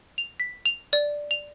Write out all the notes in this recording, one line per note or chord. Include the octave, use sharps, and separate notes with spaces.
F7
B6
F7
D5
F7